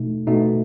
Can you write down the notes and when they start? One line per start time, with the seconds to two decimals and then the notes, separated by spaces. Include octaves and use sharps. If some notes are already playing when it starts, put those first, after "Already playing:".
Already playing: B2 A3 D#4
0.27 B2 A3 D#4